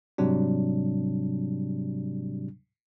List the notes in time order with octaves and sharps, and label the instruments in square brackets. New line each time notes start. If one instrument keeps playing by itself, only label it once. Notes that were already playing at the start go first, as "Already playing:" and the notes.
[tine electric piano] G#2 C3 F#3 G3 D4